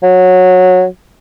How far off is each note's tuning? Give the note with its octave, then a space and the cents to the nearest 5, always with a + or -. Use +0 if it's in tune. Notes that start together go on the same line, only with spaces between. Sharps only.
F#3 -15